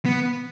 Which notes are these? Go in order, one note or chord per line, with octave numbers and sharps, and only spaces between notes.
B3